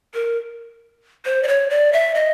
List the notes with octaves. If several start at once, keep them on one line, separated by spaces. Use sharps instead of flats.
A#4
C5
D5
C#5
D5
E5
D#5